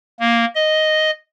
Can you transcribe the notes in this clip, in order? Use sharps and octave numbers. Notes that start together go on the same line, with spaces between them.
A#3
D#5